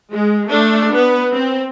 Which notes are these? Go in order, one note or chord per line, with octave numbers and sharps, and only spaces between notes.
G#3
A3 D4 A4
B3 B4
C4